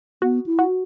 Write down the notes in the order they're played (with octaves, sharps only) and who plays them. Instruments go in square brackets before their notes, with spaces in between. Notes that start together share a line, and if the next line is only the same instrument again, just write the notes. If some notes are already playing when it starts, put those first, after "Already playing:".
[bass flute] B3 [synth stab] F#4
[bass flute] E4
[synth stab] F#4